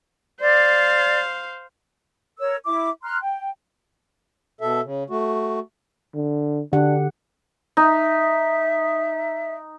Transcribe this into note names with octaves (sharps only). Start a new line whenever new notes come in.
C5 D5 F5
A#4 C#5 E6
E4 D6
A#5 C6 F6 F#6
G5
B2 A4 E5
C#3
A3 F#4
D3
D3 D4 G4 F#5
D#4 E5